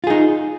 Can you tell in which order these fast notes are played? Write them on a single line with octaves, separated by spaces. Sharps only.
F4 G#4 D#4